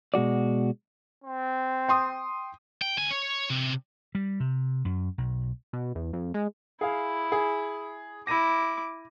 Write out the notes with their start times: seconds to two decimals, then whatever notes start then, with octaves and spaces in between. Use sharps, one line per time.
0.14 B2 G#3 F#4 D5
1.24 C4
1.88 G5 C6 D#6
2.82 G5
2.97 D2 G#5
3.11 C#5
3.50 C3
4.15 G3
4.40 C3
4.85 F#2
5.18 B1
5.73 B2
5.95 E2
6.13 F2
6.34 G#3
6.81 E4 G#4 F5
7.32 G#4
8.27 E4 D6 A#6 D#7